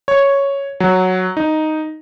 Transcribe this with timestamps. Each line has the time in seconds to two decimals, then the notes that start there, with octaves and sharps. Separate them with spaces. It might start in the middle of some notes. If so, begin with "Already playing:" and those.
0.08 C#5
0.80 F#3
1.37 D#4